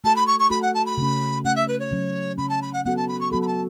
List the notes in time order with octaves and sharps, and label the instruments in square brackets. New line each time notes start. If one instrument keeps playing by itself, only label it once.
[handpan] A3 F#4 A4 [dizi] A5
[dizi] B5
C#6
C#6
[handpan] A3 F#4 A4 [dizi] B5
[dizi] F#5
A5
B5
[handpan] C#3 A3 C#4
[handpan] C#3 A3 C#4 [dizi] F#5
[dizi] E5
B4
C#5
[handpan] C#3 F#3 C#4
[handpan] C#3 F#3 C#4 [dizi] B5
[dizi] A5
B5
F#5
[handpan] F#3 B3 F#4 A4 [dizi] F#5
[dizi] A5
B5
C#6
[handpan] F#3 B3 F#4 A4 [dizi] B5
[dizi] B5
A5